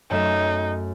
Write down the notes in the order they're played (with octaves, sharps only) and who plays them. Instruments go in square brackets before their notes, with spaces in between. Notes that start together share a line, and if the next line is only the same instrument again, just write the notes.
[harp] F#2 A3 E7 [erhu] D#4